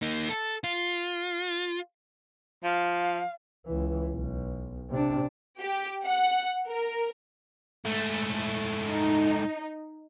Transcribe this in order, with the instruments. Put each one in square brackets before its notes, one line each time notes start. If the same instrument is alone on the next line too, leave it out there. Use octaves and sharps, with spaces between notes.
[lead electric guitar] A#3 D#4
A4
F4
[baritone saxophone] F3 [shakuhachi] F5
[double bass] C#2 E3
B1
C3 D4
[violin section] G4
F#5
A#4
[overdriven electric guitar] G#2 A3
[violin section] D#4